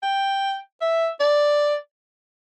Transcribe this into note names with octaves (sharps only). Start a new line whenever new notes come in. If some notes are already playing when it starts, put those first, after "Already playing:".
G5
E5
D5